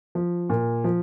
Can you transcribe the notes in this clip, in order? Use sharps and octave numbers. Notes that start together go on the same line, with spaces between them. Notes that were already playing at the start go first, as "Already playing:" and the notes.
F3
A#2
F3